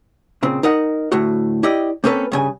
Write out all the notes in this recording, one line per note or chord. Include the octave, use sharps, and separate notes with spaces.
A#2 C#3 C4
D#4 A#4 D#5 F#5
D2 A2 F#4
E4 G4 D5 D#5
A#3 C4 C#4 A4 B4
G2 C#3 G#5